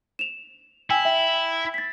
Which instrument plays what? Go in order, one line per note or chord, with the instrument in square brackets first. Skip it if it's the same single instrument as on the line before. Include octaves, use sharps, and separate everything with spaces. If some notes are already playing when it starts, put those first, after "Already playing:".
[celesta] E7 F7
[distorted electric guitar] E4 [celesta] G5 G#5
[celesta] E5 G5
A6 B6